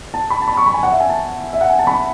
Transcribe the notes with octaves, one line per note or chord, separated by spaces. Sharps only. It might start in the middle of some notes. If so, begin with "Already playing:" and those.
A5
B5
A5
B5
C#6
B5
G#5
F#5
E5
G#5
A5
E5
F#5
G#5
A5
B5